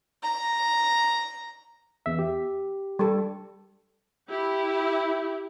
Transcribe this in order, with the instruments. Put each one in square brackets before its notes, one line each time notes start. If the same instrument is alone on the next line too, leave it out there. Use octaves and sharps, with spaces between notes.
[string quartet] A#5
[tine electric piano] E2 E5
G4
[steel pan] G3 A4
[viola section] E4 G4